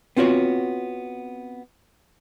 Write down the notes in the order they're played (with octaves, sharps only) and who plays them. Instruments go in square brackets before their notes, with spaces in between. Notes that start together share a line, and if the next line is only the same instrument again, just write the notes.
[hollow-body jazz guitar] B3 C4 F4 F#4 C#5